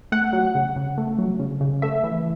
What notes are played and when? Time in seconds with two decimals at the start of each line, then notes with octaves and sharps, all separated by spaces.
0.12 A3 F#5
0.33 F#3
0.55 C#3
0.76 C#3
0.98 A3
1.19 F#3
1.39 C#3
1.61 C#3
1.82 A3 E5
2.04 E3